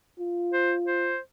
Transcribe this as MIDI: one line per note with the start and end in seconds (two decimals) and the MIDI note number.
0.19 1.16 65
0.53 0.74 72
0.86 1.18 72